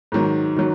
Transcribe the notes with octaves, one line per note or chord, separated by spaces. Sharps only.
G#2 D#3 F#3
D#3 F#3